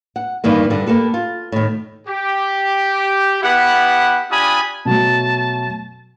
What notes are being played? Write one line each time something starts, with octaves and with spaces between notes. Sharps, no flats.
F#5
G2 D#3 E3 A#3
G2 D3
A#3 G4 A4 B4
F4
A2 D#3
G4
B3 E4 G4 F#5
D4 F4 G4 G#5 B5 D#6
B2 F#3 A3 A5